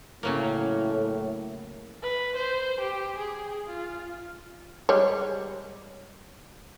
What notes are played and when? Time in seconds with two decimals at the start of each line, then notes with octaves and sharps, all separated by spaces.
0.23 A2 C#3 F#3 A#3
2.02 B4
2.36 C5
2.80 G4
3.17 G#4
3.67 F4
4.89 G3 G#3 C#5